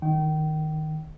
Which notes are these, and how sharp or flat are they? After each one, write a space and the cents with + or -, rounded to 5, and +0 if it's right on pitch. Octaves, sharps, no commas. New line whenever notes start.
D#3 +0 G5 -30